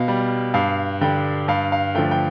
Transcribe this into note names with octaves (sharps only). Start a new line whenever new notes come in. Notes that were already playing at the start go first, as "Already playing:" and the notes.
Already playing: B2 F5
G3
G2 F5
D3 G3 G5
G2 F5
F5
D3 F3 A3 G5
G5